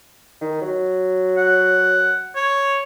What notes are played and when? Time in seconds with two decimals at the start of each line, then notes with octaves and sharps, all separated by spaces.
0.41 D#3
0.61 F#3
1.37 F#5
2.36 C#5